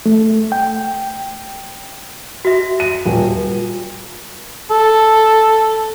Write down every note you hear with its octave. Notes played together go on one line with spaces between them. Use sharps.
A3
G5
F#4 E5
D#7
D#1
A4